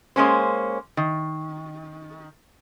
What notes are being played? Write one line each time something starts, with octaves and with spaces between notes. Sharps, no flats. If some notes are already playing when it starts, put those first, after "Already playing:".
G#3 A#3 C#4 C5
D#3